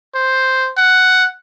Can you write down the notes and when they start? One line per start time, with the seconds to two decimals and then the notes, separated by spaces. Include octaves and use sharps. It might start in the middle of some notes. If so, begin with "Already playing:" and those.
0.15 C5
0.77 F#5